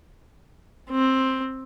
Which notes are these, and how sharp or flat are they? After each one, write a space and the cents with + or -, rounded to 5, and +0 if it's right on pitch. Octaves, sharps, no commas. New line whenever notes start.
C4 +10